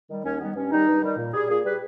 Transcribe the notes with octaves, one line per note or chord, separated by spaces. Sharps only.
D#3 G3
D#2 C#4
D#3 G3 B3
G2 C#4
D#3 G3 D#4
G2
D#3 G3
A#2
G3 G#4
A#2 G#4
G3 B4